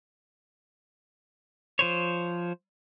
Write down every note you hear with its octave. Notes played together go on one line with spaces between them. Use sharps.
F3 C5 C#5